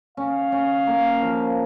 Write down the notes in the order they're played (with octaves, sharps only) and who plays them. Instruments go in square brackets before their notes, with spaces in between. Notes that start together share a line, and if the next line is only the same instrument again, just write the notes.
[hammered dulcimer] C#4 [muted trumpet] F5
[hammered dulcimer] C#4
A#3
F3